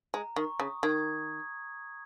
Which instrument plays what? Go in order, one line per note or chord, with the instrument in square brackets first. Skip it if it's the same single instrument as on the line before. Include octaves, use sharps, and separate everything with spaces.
[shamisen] G#3 [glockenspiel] A#5
[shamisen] D#3 [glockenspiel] C#6
[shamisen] C#3 [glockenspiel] D#6
[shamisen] D#3 [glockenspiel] D#6 G#6